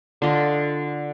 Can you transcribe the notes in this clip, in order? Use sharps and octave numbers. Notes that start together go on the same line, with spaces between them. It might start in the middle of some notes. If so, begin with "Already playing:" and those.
D3 F4 D#5